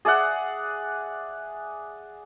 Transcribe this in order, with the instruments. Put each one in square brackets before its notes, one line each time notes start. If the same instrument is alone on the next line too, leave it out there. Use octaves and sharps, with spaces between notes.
[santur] G#4 D5 E5 F#5